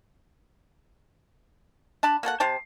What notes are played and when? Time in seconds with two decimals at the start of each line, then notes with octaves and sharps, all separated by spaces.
2.03 D4 A5 B5
2.23 A#3 F#4 A4 F#5
2.40 C3 G4 C5 A5